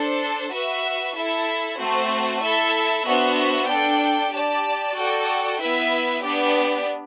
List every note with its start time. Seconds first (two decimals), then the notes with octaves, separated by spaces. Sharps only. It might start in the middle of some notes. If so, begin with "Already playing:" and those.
Already playing: D4 A4 C5
0.51 F#4 B4 E5
1.15 E4 A4 E5
1.79 A3 C4 F#4 C5
2.42 E4 A4 E5
3.05 B3 D4 F#4 C5 E5
3.68 D4 A4 D5 G5
4.32 G4 D5 A5
4.95 F#4 A4 D5 G5
5.58 B3 E4 B4 E5
6.22 B3 D4 G4 D5